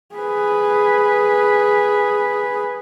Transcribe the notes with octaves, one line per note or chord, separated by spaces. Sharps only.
G#4 B4